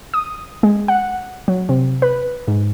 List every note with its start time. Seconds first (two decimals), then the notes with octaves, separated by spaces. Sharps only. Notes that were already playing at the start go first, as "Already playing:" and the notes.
0.14 D#6
0.63 G#3
0.88 F#5
1.48 F#3
1.69 C3
2.02 B4
2.48 G#2